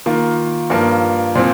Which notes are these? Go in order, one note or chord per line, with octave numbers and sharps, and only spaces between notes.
D#3 A#3 F4
G2 F3 A#3
A#2 F3 C4